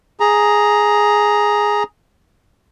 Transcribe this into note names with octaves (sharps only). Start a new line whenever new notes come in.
G#4 A#5